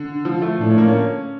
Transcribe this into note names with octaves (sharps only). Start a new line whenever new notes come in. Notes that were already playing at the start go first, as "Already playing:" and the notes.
Already playing: D3
F3
A3
A2 D4
C#4
A#3
C#4